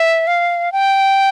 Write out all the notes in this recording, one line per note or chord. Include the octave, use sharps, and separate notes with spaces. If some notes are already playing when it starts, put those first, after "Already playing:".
Already playing: E5
F5
G5